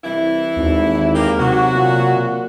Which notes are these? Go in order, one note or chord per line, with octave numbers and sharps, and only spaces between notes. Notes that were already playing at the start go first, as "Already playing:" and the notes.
C2 E3 E4
G#1 D#2
A#3 G4
C3 F#3 F#4
A#2